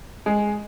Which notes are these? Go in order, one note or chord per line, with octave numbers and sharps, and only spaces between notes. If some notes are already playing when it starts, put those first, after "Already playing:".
G#3 G#4